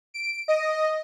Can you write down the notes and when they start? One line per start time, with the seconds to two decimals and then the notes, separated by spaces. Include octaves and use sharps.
0.14 D7
0.48 D#5